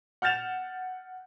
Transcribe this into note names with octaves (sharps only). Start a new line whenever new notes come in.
F#5 F6 G6 A6 E7 F7